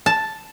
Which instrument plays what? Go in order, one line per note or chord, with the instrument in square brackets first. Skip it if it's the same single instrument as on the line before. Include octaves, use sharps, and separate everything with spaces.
[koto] A5